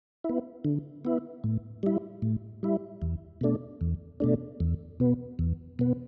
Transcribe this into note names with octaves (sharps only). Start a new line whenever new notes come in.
E4
B3
D3
B3 E4
A2
G3 E4
A2
G3 E4
E2
B2 A3 D4
E2
B2 A3 D4
E2
B2 B3
E2
B2 B3